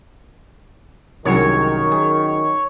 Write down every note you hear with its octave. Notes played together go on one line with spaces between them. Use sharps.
C2 F#2 D#3 G#3 F#4 C#5
G#4